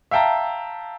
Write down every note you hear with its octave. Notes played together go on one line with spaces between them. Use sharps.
E5 F5 G5 A5 A#5